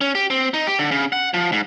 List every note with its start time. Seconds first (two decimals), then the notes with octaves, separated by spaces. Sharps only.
0.01 C#4
0.15 G4
0.30 C4
0.54 D#4
0.67 G4
0.79 D3
0.91 C#3
1.13 F#5
1.34 F3
1.52 G#2